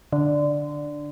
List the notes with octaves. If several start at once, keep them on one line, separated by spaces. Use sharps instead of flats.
D3